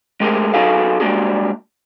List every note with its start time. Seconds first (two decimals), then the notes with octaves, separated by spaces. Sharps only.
0.20 G#3 A3 G4 G#4 A#4
0.54 F#3 D#4 F#4 G#4 A4 F5
1.00 G3 G#3 A#3 D4 F#4 G#4